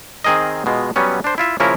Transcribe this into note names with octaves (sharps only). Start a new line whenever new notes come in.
D#3 C4 G#4 A#4 D#5
B2 G#3 F4
F#3 G3 B3 C#4
D4 C5
E4 F4 E5
C#3 F3 A#3 C#4 E4 A#4